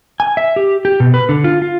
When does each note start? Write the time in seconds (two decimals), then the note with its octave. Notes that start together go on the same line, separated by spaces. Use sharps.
0.20 G#5
0.37 E5
0.56 G4
0.85 G4
1.00 B2
1.14 B4
1.29 D3
1.44 F4
1.62 F4